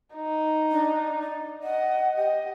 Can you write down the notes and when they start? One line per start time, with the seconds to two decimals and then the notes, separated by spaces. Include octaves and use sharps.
0.15 D#4
0.72 D4
1.20 D5
1.63 D#5 F#5
2.17 G4 D#5